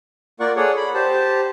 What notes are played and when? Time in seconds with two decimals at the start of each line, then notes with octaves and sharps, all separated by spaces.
0.40 A#3 F4 A#4 D5 F#5 C#6
0.57 G#4 A4 C#5 D5 F#5
0.77 B5
0.94 G4 C5 A5